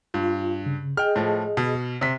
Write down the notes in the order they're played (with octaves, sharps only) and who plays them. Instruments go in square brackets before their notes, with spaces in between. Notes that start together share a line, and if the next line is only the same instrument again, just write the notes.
[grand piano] G2 [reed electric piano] F4
[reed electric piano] C#3
[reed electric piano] G#4 D#5 [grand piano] G5 F6
[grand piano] A2 F3
B2
C3 B6